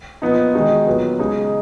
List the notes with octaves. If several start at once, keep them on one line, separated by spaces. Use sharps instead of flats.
A#2 F3 B3 D#4
D#3 G#3 D#4 F#4
A#2 F#3 B3
C#3 G#3 D#4